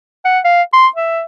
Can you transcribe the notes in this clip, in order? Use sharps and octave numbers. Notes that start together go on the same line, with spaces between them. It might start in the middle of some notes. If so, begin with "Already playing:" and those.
F#5
F5
C6
E5